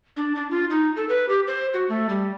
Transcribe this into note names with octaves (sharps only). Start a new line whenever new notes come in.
D4
D4
F4
D#4
A4
B4
G4
C5
F#4
A3
G3